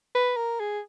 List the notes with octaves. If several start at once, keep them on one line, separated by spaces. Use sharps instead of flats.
B4
A#4
G#4